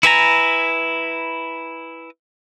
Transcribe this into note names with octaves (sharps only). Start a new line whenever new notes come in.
E4 B4 G#5 A#5